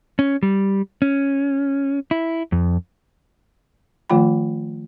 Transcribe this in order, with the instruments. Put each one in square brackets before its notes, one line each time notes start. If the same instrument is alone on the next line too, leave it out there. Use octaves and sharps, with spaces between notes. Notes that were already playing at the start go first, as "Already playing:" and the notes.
[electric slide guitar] C#4
G3
C#4
E4
F2
[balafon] D#3 F3 A3 F4 G5 B5